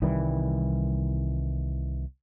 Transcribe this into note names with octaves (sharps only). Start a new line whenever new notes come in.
C2 D#3 E3 G3